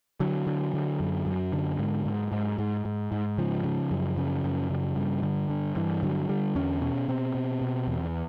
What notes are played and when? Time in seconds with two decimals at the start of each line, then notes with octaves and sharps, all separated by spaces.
0.20 D3 F#3
0.47 D3
0.74 D3
1.00 F#2
1.26 F#2
1.53 D3
1.79 G#2
2.05 G#2
2.32 G#2
2.58 G#2
2.85 G#2
3.12 G#2
3.38 C#3 F3
3.64 C#3
3.91 F#2
4.17 C#3
4.44 F#2
4.70 C#3
4.96 G2
5.23 D3
5.49 G2
5.76 G2 E3
6.03 D3 F#3
6.29 D3 G3
6.55 E2 C#4
6.81 B2 C#4
7.08 B2 C4
7.35 B2
7.61 B2
7.87 E2